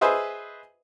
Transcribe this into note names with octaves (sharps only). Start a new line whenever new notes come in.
G#4 B4 C5 D#5 E5